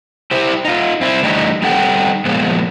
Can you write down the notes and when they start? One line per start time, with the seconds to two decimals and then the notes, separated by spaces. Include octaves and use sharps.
0.31 E4 G4 C5
0.65 D#4 F4
1.01 C4 E4
1.23 E3 G3 A3 D4 D#4
1.62 G3 C4 D#4 A4 F#5 G5
2.25 A#2 F3 G#3 B3